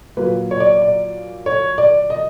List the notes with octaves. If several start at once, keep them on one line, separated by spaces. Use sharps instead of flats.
A#2 F#3 A#3 B4
C#5
D5
D5
C#5
D5
D#5